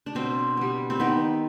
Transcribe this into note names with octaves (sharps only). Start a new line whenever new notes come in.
D4
B2 C4
G3 B3
C4
D#3 B3